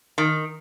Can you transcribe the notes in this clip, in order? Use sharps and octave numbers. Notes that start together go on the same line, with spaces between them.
D#3